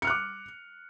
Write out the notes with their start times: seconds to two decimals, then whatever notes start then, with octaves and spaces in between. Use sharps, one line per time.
0.02 C#7
0.05 F6
0.07 F#6
0.10 D6